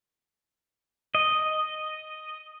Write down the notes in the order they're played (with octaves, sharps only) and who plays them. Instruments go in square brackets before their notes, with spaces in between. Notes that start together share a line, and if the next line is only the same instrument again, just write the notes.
[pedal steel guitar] D#5